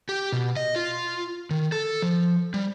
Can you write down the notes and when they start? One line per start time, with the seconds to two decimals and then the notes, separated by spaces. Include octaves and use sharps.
0.09 G4
0.32 B2
0.56 D#5
0.76 F4
1.50 D#3
1.72 A4
2.02 F3
2.54 G3